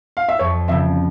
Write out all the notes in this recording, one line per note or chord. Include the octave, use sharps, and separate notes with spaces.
F5
E5
F2 C#5
C#3 F3 C4 E5